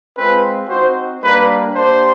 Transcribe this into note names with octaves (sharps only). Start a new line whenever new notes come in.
G#3 C4 F4 B4
C4 D#4 F#4 C5
G3 A#3 D4 B4
A#3 D4 G4 C5